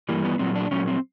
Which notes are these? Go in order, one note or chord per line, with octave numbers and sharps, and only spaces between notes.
G2 E3 G3 A#3
B3
A#2 F#3 C4
D4
A#2 F#3 C#4
C4